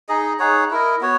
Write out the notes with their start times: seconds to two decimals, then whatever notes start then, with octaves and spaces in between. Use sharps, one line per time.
0.09 D#4 G#4 D#5
0.39 D#4 G#4 C#5 F#5
0.71 E4 A#4 D#5
1.01 B3 F#4 C#5